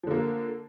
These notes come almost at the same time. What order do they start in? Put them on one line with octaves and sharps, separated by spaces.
F3 D3 A#3